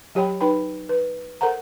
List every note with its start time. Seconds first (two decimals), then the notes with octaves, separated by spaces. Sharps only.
0.15 F#3 G4 C#5 G5 B5
0.41 D#4 B4 G5 B5
0.89 B4
1.41 A4 A#4 C5 F#5 A#5